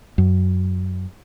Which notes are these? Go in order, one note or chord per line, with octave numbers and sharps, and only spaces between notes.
F#2